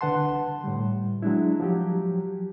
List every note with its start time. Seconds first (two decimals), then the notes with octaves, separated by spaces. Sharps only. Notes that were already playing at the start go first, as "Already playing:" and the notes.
0.01 C2 D3 B4 F#5 A5 C6
0.64 A2 G3
1.22 F#3 G#3 D4 E4
1.60 F3 F#3 G4